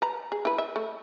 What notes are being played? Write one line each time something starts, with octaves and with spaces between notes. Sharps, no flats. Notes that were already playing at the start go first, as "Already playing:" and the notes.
B4 A#5
G#4
E4 B4
E5
A3